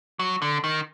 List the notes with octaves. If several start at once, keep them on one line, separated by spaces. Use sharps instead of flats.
F#3
D3
D#3